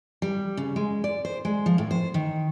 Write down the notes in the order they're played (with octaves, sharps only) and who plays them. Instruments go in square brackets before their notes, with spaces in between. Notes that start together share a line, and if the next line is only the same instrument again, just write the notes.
[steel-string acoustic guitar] G3
C#3
G#3
D5
C5
G#3
F3
A2
C5
D#3